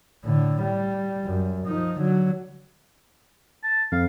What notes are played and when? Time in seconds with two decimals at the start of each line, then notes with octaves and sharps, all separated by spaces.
0.25 A2 D3
0.62 G3
1.25 F#2
1.65 F3 D#4
1.99 D3 F#3
3.64 A5
3.92 F2 F5